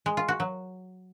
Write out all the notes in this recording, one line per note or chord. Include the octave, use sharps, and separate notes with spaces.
G#3
F4
F#4
F#3